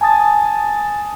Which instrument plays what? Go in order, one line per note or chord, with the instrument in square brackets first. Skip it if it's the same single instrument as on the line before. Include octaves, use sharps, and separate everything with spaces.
[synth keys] G#5 A5 D#6 A6